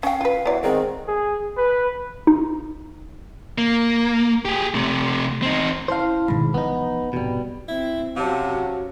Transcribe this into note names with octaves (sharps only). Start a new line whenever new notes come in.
C#4 F5 G5
F4 B4
C3 E3 F#3 B3 D5
G#2 D#3 C4
G#4
B4
D#4
A#3
G4 G#4
C3 A3
C4 D#4
C#4 E4 C5 F5 A5
G#2 B2 D#3 B5
E3 F3 B3 D#4
F2 G#2 B2 G3
C4 E4
C3 F#3 C#4 F#4 F5 A5